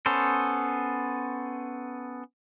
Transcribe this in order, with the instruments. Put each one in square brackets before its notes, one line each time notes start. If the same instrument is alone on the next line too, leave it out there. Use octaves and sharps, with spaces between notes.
[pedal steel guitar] B3 C#4 A4 C5